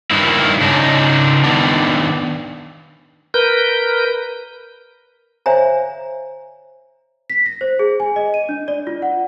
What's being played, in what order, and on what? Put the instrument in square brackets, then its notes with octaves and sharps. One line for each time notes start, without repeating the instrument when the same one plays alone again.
[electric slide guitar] G2 D#3 A#3 E4
C#3 D4 D#4
D#3 B3 D4
[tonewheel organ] A#4 B4 G6
[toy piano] C5 C#5 E5 F5 G#5 A#5
[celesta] B6
A#6
C5
G#4
G#5
D#5
D#7
D4
D5
F4
F#5